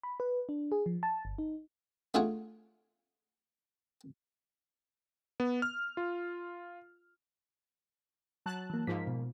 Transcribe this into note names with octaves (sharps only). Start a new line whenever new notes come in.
B5
B4
D4
G#4
F3
A5
G1
D#4
A3 D4 F4 G#4 C#5 F#5
B3
F6
F4
F#3 A5 F#6
E3 A#3
G#2 F3 A#3 B6
B2